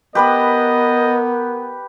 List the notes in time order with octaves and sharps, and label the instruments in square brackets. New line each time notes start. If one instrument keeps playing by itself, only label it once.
[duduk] B3 [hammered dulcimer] G4 B4 B5 [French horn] A#4 [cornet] D#5